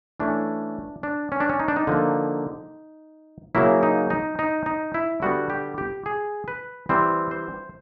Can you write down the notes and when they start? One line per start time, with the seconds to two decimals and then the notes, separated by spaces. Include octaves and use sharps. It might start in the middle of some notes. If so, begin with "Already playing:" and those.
0.20 E3 A3 C#4 D4
1.03 D4
1.32 C#4
1.40 D4
1.49 C#4
1.60 D#4
1.68 D4
1.76 D#4
1.87 D3 F3 A#3
3.55 C#3 F#3 A#3 C#4 E4
3.83 D#4
4.10 D#4
4.39 D#4
4.66 D#4
4.94 E4
5.22 D3 G3 B3 F#4
5.50 G4
5.78 G4
6.06 G#4
6.48 B4
6.89 E3 G3 C4 C5
7.31 C5